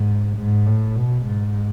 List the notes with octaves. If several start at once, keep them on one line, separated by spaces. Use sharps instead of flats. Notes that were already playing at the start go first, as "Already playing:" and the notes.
Already playing: G#2
G#2
A2
B2
G#2